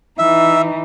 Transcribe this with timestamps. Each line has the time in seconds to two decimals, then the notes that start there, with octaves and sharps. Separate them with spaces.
0.18 E3 D#4 E5